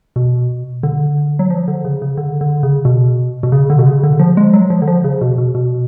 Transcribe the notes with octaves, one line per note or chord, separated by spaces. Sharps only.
B2
D3
F#3
F3
D3
C#3
C#3
D3
D3
C#3
B2
B2
C#3
D3
B2
C#3
D3
F3
G#3
F#3
F3
D3
F3
C#3
B2
B2
B2